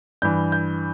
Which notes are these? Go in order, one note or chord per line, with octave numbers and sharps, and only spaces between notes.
G2 E3 G6
G6